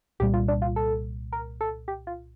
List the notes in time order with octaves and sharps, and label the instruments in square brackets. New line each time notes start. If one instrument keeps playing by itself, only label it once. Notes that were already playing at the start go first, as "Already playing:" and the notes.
[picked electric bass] C2 A#2 G3 [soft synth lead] G4
[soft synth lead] F4
D4
F4
A4
A#4
A4
G4
F4